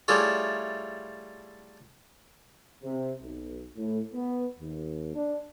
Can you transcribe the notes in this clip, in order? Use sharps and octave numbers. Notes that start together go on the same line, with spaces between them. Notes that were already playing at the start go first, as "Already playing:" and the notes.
G3 A3 E4 F4 G#4 C#5
C3
B1
A2
B3
D#2
D4